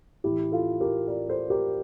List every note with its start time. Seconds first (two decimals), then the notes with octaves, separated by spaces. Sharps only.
0.24 A2 E3 E4 G4
0.52 F4 A4
0.80 G4 A#4
1.08 A#4 D5
1.28 A4 C5
1.50 G4 A#4